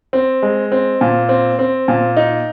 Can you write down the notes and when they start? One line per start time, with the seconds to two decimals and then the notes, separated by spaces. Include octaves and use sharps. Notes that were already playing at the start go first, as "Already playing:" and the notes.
0.13 C4
0.42 G#3
0.72 C4
1.01 A#2
1.29 C4
1.59 C4
1.88 A#2
2.17 D#4